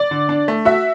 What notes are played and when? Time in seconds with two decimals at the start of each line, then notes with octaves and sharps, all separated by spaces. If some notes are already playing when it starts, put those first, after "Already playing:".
Already playing: D5
0.11 D3
0.29 D4
0.48 A3
0.65 F#4 E5